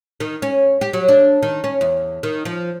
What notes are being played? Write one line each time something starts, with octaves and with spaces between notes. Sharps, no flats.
D#3
C#4
G4
F#3
D4
D#3
C#4
E2
D#3
F3